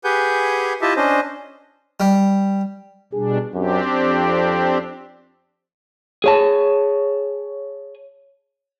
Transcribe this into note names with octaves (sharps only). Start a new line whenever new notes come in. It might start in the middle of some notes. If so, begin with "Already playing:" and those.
G4 G#4 B4 F#5 G#5 G6
E4 F4 G4 D#5 E5 A5
C#4 D4 C5 D#5
G3
B2 G3 D4 G#4
F#2 C4 D4 G4
F2
G#4 C#5 A5